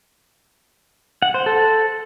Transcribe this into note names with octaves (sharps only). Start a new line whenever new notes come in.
F#5
C5
A4